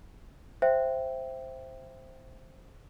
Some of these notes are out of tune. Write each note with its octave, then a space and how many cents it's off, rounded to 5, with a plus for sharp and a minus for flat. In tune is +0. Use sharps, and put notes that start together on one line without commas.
C5 +0 E5 +10 G5 +0